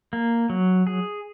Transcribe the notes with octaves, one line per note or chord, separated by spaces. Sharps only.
A#3
F#3
G#4